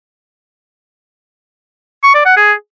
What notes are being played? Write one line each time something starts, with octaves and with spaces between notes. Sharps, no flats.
C#6
D5
F#5
G#4